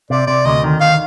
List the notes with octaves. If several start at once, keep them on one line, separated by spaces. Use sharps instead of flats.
C3 D5
C3 D5
D2 D#5
D#3
D#3 F5